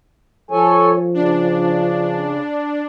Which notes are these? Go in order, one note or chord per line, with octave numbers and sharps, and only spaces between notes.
F3 A4 C#5 G#5
C#3 D4